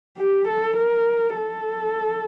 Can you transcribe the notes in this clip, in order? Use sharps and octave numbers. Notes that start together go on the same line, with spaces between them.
G4
A4
A#4
A4